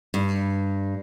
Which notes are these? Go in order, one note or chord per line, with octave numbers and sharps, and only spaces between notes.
G2